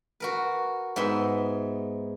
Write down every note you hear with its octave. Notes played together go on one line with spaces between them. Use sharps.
F#4 A#4 B4
G#2 B3 E5 C6